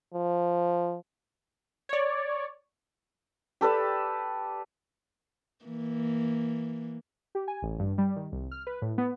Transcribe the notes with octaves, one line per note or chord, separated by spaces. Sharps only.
F3
C#5 D5
G4 A4 B4 D5
E3 A#3
G4
G#5
A1
G2
G3
D#3
C2
F6
B4
A2
B3